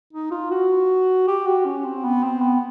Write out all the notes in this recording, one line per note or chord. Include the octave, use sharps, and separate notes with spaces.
D#4
F4
F#4
G4
F#4
C#4
C4
B3
C4
B3